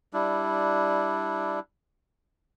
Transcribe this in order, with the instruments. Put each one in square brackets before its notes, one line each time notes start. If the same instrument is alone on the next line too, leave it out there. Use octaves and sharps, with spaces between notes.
[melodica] G3 D4 E4